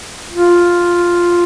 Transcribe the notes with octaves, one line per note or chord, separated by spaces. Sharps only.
F4